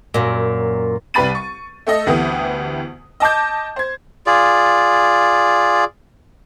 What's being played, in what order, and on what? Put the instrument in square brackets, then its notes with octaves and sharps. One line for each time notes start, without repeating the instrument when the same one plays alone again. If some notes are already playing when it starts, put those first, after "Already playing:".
[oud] F#2 A#2
[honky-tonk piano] C2 G3 B4 B5 A6 D#7
C#6
A3 A4 D#5
D2 E3 B3 G4 D#6
D#5 A5 D6 G6
C5 G#6
[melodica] F4 G#4 D5